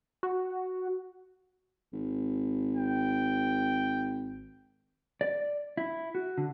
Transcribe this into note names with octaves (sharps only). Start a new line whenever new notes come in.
F#4
G#1
G5
D5
E4
F#4
D3